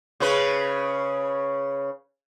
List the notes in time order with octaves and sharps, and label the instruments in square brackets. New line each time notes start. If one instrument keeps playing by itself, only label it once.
[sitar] C#3 C#4 B4